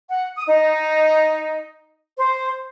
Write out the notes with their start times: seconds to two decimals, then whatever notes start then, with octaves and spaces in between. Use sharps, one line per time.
0.08 F#5
0.35 D#6
0.47 D#4
2.16 C5